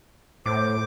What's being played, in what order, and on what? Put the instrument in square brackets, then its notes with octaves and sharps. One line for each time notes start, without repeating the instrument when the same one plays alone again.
[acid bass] A2 [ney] C5 [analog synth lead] D6